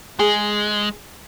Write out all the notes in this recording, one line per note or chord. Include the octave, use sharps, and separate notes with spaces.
G#3 G#4